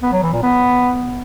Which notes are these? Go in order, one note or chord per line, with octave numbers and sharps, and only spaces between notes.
B3
F#3
E3
A#2
B3